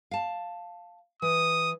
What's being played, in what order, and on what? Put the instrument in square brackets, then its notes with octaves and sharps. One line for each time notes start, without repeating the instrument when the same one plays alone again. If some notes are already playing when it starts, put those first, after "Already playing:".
[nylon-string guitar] F5 A5
[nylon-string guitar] E3 [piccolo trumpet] D#6